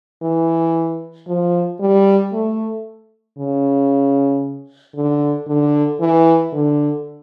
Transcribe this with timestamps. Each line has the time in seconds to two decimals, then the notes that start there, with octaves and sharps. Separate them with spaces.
0.23 E3
1.28 F3
1.80 G3
2.33 A3
3.38 C#3
4.96 D3
5.48 D3
6.00 E3
6.53 D3